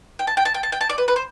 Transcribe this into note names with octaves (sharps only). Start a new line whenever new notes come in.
G5
A5
G5
A5
G5
A5
G5
A5
D5
B4
B4
C5